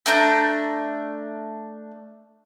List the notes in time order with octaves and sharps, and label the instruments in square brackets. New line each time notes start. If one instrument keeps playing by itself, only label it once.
[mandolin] A3 D4 A#5 G6